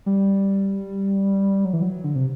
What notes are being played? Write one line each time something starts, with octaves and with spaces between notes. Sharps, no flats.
G3
F#3
E3
F#3
D3
C3